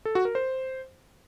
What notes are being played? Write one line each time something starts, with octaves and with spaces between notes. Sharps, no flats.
A4
F#4
A#4
C5